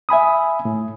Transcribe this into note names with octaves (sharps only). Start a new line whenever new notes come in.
E5 G#5 B5 D#6
A2